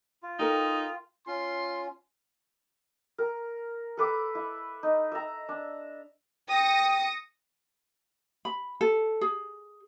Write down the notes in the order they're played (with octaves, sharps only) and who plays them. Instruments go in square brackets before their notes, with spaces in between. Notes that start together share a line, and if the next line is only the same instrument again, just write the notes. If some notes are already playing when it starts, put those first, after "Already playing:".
[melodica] F4
[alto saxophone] D#4 [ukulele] A4 A#4 G5
[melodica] C#4 F4 [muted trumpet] C6
[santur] A#4
A4 B4 D6
E4
D#4
E5 A#5
D4
[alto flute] G5 [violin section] D#6 A#6 C#7
[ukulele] B5
A4
G#4